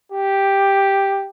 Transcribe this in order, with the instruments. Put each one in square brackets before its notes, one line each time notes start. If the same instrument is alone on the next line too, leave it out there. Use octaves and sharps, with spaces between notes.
[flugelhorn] G4